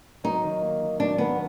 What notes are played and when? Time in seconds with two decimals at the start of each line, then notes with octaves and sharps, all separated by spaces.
0.24 F#3 D#4
0.44 D#3
0.62 A#3
0.81 D#3
0.99 F#3 D4
1.18 D#3 B3